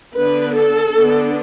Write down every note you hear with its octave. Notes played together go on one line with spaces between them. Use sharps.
D3 B3 D4 B4
A4
D3 B3 D4